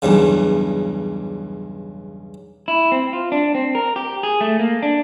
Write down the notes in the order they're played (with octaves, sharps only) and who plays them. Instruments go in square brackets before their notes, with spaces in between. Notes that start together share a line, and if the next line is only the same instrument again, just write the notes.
[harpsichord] B1 E2 G2 C#3
[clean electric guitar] E4
C4
F4
D4
C4
A#4
G4
G#4
A3
A#3
D4